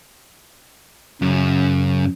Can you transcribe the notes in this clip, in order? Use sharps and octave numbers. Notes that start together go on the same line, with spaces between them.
F#2 C#3